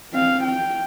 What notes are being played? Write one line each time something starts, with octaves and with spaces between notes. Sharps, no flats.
C4 F5
G5